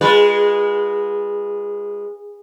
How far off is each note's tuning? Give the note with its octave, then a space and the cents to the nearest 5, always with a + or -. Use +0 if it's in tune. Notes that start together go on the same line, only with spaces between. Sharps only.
G#3 -20 F4 +10 B4 -15